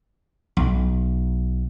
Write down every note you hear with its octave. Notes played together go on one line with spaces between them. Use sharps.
B1